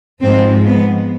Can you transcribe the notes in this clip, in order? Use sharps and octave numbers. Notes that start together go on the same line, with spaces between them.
G#2 F3 G#3 C4
B3